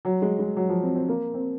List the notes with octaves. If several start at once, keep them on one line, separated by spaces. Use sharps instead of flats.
F#3
G#3
G#3
F#3
F3
C4
C4
A#3
C4